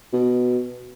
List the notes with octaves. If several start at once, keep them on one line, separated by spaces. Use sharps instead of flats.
B2